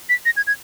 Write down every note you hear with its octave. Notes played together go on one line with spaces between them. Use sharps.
B6
A#6
G#6
G#6